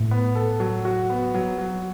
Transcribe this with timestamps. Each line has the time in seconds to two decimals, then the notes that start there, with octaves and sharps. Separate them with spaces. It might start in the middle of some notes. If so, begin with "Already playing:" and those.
Already playing: A2
0.11 B3
0.35 A4
0.60 F#3
0.85 F#4
1.10 B3
1.34 F#3
1.58 F#3